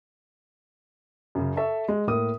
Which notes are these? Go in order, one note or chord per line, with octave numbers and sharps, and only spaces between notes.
F#2 C#3
A4 E5 A5 C#6
G#3
A2 A#3 D#6